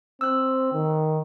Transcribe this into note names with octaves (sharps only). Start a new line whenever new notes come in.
C4 E6 F#6
D#3